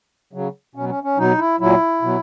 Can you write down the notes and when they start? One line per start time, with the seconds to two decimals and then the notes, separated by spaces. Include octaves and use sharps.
0.33 C#3 F#3
0.75 B2 F#3 C#4
0.89 C#4
1.03 C#4
1.18 B2 F#3 D#4
1.39 E4
1.60 A#2 F#3 E4
2.02 B2 F#3